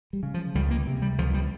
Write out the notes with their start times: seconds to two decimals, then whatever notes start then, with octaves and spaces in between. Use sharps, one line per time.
0.13 G3
0.23 C#3
0.34 F3
0.55 C#2 G3
0.71 A#3
0.87 C3
1.02 G3
1.18 C#2 F3
1.34 G3